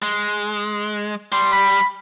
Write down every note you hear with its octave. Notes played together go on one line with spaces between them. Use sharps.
G#3
G3 C6
B5